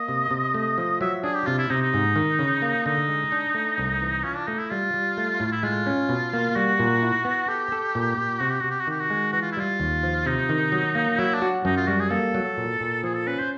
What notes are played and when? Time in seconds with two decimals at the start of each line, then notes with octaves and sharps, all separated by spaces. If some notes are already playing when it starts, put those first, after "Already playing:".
Already playing: A#3 D#5
0.08 C3
0.31 C3
0.54 A3
0.78 F3
1.01 F#3 E5
1.24 D4 G#4
1.35 G4
1.47 C3 F4
1.58 E4
1.70 C3 D#4
1.82 D#4
1.94 G#2
2.16 D#3
2.39 C#3
2.62 A#3
2.86 D3 D#4
3.08 G#3
3.32 D4
3.55 A3
3.78 C2
4.01 E3
4.24 C#4 F4
4.36 D4
4.47 A3 D#4
4.59 E4
4.71 G3 F4
4.94 G3
5.17 A3
5.40 A2
5.52 E4
5.63 G#3 F4
5.86 C#4
6.09 B2
6.33 A#3
6.56 G3 F#4
6.79 A#2
7.03 E4
7.25 B3
7.48 G4 A4
7.72 A4
7.95 A#2
8.17 A#2
8.40 C3 F#4
8.50 G4
8.60 C3 F#4
8.71 G4
8.80 F#4
8.87 D#3 G4
9.00 F#4
9.10 G#3
9.33 E3 F#4
9.42 F4
9.52 E4
9.57 G3 F4
9.80 D#2
10.03 F3
10.26 C3 D#4
10.49 D#3
10.72 F#3
10.95 A#3
11.19 F#3 E4
11.34 D4
11.42 F#4
11.65 F#2 D#4
11.77 F4
11.88 G3 F#4
12.00 G#4
12.11 A#3 A4
12.34 F#3
12.57 A#2
12.81 A#2
13.03 F3 G#4
13.16 A4
13.27 C#4 B4
13.39 C5